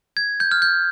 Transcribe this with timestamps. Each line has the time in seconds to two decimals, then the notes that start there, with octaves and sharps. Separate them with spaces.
0.17 G#6
0.40 G6
0.51 F6
0.62 G6